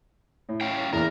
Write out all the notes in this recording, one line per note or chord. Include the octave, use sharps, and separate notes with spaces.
A2
C#4 F5 G5
E2 A#3 A#4 F6